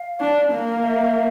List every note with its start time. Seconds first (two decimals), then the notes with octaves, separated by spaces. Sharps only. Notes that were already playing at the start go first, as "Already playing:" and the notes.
Already playing: F5
0.21 D4
0.52 A#3
0.83 E5